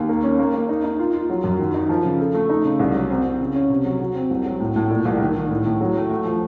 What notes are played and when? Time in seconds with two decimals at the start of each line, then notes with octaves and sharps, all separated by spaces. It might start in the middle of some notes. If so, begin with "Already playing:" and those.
Already playing: D#2
0.09 A#3
0.24 C#4
0.39 A#3
0.54 A#3
0.69 D#4
0.84 D#4
0.99 F4
1.14 F4
1.30 F#3
1.44 F#2
1.60 D#3
1.74 D#4
1.89 F3
2.05 C#3
2.20 A4
2.35 A3
2.49 D#4
2.65 C#3
2.80 C2
2.95 F#3
3.10 C4
3.25 C4
3.40 C#3
3.55 C#4
3.70 C3
3.85 F#3
4.00 F#3
4.15 C4
4.31 C2
4.45 F#3
4.60 A2
4.76 A2
4.90 A#2
5.05 C2
5.21 D#3
5.35 D#3
5.51 A2
5.66 A2
5.81 F#3
5.96 A3
6.10 A3
6.25 F3